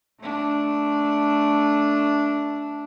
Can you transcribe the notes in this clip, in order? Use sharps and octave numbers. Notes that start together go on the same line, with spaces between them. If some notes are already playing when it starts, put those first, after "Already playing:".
A3 D4